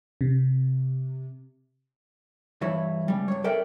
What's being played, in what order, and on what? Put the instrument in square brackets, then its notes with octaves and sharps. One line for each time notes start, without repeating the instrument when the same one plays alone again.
[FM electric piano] C3
[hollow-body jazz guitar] G2 E3 E4 C#5
C#2 G3
G2 C#5
A4 A#4 D5 E5 G5